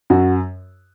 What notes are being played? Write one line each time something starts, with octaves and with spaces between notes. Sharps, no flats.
F#2 F#4